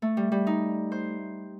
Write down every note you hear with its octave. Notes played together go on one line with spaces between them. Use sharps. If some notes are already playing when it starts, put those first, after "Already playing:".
A3
G3
G3
D#4
C5